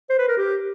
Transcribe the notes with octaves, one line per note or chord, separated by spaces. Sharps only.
C5
B4
A#4
G4